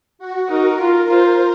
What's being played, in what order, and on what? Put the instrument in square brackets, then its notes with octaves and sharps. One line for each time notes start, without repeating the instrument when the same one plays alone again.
[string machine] F#4
[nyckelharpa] D#4 [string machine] A#4
[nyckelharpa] F4 [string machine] A#4
[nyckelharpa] F4 [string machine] C5